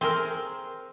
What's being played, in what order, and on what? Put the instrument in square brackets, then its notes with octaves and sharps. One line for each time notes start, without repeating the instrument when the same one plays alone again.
[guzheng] C4 G#4 A#4